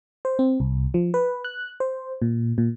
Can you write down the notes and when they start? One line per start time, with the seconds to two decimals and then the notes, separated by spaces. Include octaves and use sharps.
0.25 C5
0.39 C4
0.60 C2
0.94 F3
1.14 B4
1.44 F#6
1.80 C5
2.22 A#2
2.58 A#2